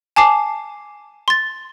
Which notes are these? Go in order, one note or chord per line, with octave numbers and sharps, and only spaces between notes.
G#5 A5 D6 C7
C6 A6